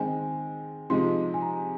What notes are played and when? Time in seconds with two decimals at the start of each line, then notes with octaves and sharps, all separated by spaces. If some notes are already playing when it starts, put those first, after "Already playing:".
Already playing: D#3 G#3 C4 G#5
0.90 C3 F3 G#3 D#4 C6
1.34 G#5
1.42 A#5